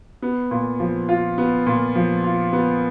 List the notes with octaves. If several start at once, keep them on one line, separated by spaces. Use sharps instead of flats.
B3
A#2
F3
F4
B3
A#2
F3
F4
B3